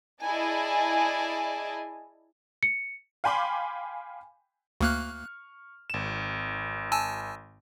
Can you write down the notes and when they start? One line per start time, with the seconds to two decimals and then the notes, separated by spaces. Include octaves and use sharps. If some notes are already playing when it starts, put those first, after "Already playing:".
0.22 E4 G#4 D5 D#5 G#5 A5
2.63 C#7
3.24 F5 G5 G#5 B5 C6 D6
4.81 D2 A#3 C#6 F6 F#6
5.90 G#1 E7
6.92 G#5 A5 E6